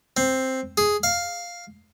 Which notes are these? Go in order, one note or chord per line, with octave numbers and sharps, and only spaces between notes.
C4
G#4
F5